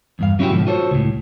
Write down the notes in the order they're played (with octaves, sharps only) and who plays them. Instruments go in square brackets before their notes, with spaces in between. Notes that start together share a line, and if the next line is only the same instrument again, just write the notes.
[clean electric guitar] E2 G2 F5
F#3 C#4 D4 E4 F#4 G4
G#2 B2 D3 F3
F4 F#4 A4 C5 C#5
C#2 A2